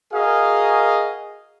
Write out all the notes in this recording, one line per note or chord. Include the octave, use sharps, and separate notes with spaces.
F#4 G#4 A#4 D#5 F5